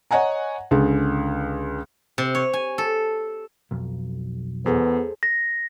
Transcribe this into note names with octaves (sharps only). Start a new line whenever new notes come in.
C#5 D#5 F#5 G#5 A#5
C#2 D3 G#4
C3
C#5
G#5
A4
B1 F2
E2 B3 G#4 A4 C5
A#6